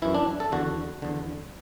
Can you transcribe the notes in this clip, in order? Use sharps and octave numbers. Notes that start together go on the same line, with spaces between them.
F#2 E3 E4
D4
A4
E2 D3 F#4
E2 D3